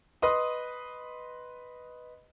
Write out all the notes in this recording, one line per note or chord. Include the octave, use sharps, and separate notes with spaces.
B4 D#5 C6 D#6